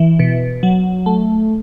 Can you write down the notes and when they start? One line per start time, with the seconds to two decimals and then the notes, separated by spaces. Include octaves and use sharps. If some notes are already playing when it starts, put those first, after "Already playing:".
Already playing: E3
0.19 B2
0.63 F#3
1.06 A3